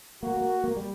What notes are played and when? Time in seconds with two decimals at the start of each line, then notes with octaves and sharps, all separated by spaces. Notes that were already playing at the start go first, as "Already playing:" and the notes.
0.23 A#3 F#4
0.37 A#3
0.64 A#3
0.76 G3